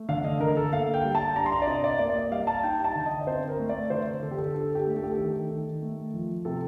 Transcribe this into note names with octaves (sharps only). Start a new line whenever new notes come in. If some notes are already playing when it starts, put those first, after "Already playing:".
Already playing: A3
D3 F5
D#5
D3 A#4
A4
A#3 F5
G5
G3
A5
D4 A#5
C6
A#5
D5
C3 D#5
D5
A#3 D5
D5
D#5
G3 F5
A5
D#4 G5
A5
D3
D#5
D5
C4 C5
A#4
A3
D5
D3 C5
D3 A4
G4
A4
D4 A4
G4
A3
A4
G4
A4
D#3
D#3
A3
F3
C3 A4